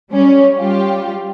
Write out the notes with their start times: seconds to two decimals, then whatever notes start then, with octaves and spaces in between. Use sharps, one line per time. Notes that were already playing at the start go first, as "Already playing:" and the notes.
0.11 G3 C#4 C#5
0.58 G3 F4 G4